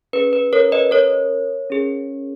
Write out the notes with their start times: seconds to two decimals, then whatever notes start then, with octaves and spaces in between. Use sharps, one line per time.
0.13 C#4 G#4 B4
0.33 B4
0.53 A#4 C#5
0.72 B4 D#5
0.91 A#4 C#5
1.70 C#4 G#4